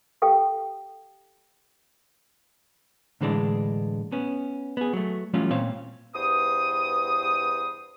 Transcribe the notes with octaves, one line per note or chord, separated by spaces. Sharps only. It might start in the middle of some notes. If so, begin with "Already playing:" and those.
G4 A4 F5 G5
A2 D3 E3 G#3 D4
B3 C#4
B3 G#4
F#3 A3
E3 F#3 G3 A3 C#4 F4
A#2 C4 C5 C#5 F5
E2 G2 C5 D#6